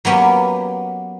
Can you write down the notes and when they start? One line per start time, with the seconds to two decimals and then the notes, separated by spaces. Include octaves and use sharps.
0.05 F#3 A#3 B3 C#4 G4